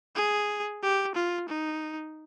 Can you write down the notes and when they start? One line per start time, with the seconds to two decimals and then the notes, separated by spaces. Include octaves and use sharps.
0.16 G#4
0.82 G4
1.15 F4
1.49 D#4